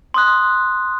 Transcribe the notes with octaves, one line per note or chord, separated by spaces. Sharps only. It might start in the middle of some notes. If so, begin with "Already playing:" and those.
C6 D#6 F#6